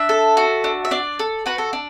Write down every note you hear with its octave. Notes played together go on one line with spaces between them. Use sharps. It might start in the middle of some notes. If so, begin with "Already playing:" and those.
Already playing: D4 E5
A4
F#4
D4
E5
D4 D5
A4
F#4 B4
A4
D4